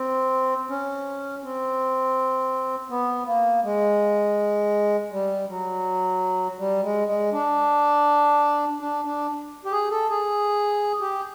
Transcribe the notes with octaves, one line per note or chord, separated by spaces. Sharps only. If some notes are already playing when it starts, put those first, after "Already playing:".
Already playing: C4
C#4
C4
B3
A#3
G#3
G3
F#3
G3
G#3
G#3
D4
D4
D4
G4
G#4
A4
G#4
G4